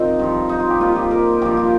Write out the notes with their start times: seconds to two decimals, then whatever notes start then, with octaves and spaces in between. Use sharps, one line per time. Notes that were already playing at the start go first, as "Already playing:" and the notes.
Already playing: D#3 C4 D#4 F4 G4 A#4
0.19 G2 F3
0.49 D#4
0.60 F4
0.70 G4
0.80 A#2 F3 F4
0.96 G4
1.11 A#4
1.42 G2 F3 G4
1.57 F4